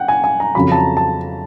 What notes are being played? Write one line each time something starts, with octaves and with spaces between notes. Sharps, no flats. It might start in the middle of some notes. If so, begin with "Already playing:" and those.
Already playing: F#5 G5
G#5
G#5
A#5
F2 C#3 F#3 B5
A5
A#5
A5